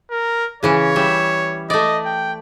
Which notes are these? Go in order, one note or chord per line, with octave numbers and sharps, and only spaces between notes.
A#4
C#3 E3 C#4 C#5
G3 E5
A3 D5 D#5
G5